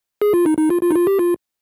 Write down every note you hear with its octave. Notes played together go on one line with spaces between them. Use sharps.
G#4
F4
D#4
D#4
F4
F4
D#4
F4
G4
F4